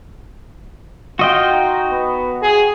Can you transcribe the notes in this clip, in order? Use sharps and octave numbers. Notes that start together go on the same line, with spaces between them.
F4 F#4 D#5 G5
D#4
B3
G#4